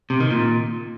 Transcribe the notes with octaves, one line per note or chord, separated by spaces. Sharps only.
C3
D#3
A#2